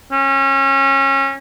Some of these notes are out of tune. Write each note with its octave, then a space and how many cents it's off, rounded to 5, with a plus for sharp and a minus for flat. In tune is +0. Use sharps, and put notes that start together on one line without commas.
C#4 -25